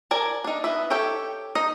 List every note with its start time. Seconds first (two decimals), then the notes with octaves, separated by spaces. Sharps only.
0.11 A#4 D5 G#5 A5
0.44 D4 D#4
0.64 B3 B4 D#5 E5
0.90 G4 A4 C#5 G5
1.55 D#4 D#5